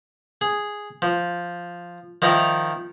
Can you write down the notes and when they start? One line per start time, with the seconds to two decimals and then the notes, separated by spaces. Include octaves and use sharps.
0.41 G#4
1.02 F3
2.22 D#3 F3 D#4 E4 A#4